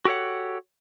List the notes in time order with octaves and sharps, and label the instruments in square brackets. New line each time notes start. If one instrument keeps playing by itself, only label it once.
[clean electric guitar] F#4 G4 A4 C#5 F#5